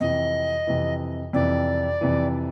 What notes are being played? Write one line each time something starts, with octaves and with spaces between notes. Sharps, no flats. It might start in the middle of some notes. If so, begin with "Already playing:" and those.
F2 C3 E3 D#5
F2 C3 E3
F2 C3 E3 D5
F2 C3 E3